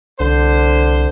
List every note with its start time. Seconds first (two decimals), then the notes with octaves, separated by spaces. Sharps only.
0.20 C2 D3 C5